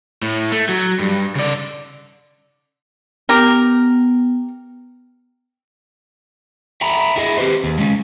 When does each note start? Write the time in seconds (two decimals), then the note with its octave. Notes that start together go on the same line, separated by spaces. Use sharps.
0.22 A2
0.52 A3
0.69 F#3
0.99 G2
1.35 C#3 D5
3.29 B3 G4 A#4
6.81 E5 G5 A#5 B5
7.16 E4 G#4 D#5
7.38 C4 G4 B4 C5
7.64 D#2
7.79 G#3 C#4